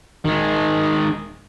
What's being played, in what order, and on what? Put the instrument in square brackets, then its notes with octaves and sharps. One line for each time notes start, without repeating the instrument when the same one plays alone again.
[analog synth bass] D#1 [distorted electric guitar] D#3 G#3